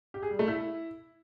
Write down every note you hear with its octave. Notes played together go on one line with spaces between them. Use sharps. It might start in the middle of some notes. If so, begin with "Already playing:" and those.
G4
G#4
G3
A3
E4